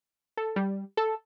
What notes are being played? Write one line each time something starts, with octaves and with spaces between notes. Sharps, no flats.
A4
G3
A4